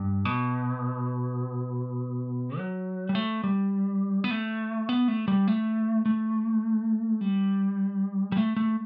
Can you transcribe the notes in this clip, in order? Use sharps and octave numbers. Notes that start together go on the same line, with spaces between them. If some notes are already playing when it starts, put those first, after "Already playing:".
Already playing: G2
B2
F#3
G3
A3
G3
B3
A3
B3
A3
G3
A3
A3
G3
G3
A3
A3